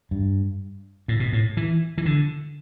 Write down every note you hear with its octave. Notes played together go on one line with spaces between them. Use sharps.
G2
A2
B2
A2
E3
E3
D3